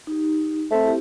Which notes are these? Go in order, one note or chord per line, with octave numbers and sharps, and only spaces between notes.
D#4 G4
A3 C4 C5
E4 G4